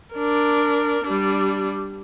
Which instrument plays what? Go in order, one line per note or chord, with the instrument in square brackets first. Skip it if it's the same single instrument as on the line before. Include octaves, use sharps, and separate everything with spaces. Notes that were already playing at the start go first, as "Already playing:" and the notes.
[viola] D4 A#4
G3 D4